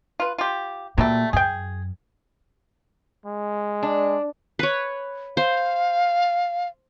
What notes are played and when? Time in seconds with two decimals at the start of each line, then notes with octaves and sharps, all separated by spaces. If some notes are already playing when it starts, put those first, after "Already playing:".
0.20 F4 B4
0.38 F4 G4
0.98 A#2 F#3 G3 A3
1.33 F#2 G#4 G5
3.26 G#3
3.83 D4
4.59 B4 C#5
5.37 C5 F5